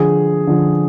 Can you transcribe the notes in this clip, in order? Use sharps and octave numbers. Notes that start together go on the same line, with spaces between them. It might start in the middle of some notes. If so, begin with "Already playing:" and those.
Already playing: D3 F3 G#4
D3 F3